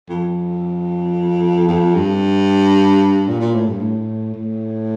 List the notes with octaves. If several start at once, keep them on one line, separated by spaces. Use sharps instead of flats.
F2
F2
G2
A#2
A#2
A2
G2
A2
A2